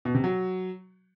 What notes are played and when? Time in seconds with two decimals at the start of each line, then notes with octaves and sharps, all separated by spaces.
0.05 B2
0.14 C3
0.24 F#3